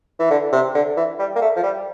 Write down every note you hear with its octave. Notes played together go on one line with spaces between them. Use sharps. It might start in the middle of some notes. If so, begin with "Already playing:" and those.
E3
D3
C3
D3
E3
G3
A#3
A3
F3
G3